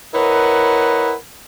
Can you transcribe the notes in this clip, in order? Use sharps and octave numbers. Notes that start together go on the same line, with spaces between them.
E4 A#4 B4 C#5 D#5 F#5